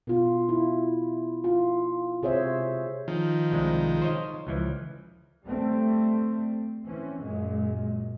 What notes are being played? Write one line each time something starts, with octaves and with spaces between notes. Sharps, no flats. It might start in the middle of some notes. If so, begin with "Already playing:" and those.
B2 F4
E4
F4
C3 G#4 C5 C#5 E5
D#3 F3
C2 G#3
C5 C#5 D#5
C#2 E3 F3
G3 A3 C4
E3 C4 C#4
F#2 A#2 G#3